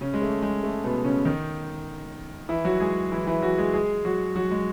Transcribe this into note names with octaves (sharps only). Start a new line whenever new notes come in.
C#3 C#4
G#3
A3
G#3
A3
B2 B3
C#3 C#4
D#3 D#4
E3 E4
F#3 F#4
G#3 G#4
E3 E4
E3 E4
F#3 F#4
G#3 G#4
G#3 G#4
F#3 F#4
F#3 F#4
G#3